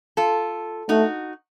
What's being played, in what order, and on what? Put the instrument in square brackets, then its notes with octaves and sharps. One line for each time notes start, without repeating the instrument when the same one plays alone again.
[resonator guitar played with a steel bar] F4 A4
[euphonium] A3 [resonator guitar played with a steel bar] D#4 F#4